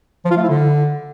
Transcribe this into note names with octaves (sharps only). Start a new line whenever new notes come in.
F3
F4
A3
E4
D3